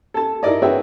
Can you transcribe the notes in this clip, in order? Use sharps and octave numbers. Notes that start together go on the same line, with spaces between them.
A4 A5
D#4 E4 A#4 D5 D#5
F#4 G#4 B4 C#5 E5 G5